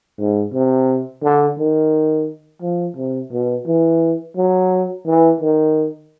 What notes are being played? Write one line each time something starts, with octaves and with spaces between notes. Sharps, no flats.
G#2
C3
D3
D#3
F3
C3
B2
E3
F#3
E3
D#3